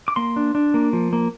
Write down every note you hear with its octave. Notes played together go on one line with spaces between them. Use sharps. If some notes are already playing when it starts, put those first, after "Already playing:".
D6
A#3 C6
D4
D4
A#3
F3
A#3